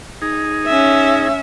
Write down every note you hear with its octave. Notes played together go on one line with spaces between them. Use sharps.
D#4 G#4
C#4 E5